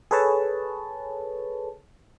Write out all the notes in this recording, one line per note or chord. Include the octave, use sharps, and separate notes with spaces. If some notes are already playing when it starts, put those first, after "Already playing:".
G#4 A4 B4 C#5 A5